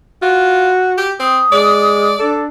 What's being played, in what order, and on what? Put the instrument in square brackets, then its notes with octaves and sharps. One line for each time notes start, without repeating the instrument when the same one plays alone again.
[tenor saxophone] F4 [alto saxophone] F#4
[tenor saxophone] G4
[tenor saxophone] C4 [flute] D#6
[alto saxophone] G#3 [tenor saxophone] D5
[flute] D4 [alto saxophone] A4